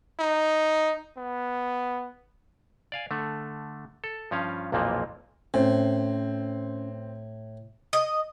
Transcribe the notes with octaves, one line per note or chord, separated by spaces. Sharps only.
D#4
B3
D5 F5 G#5
D3 A3
A4
G2 F3 C#4 F5
B1 F2 A#2 E3 F3 A#3
A2 C4 C#4
D#5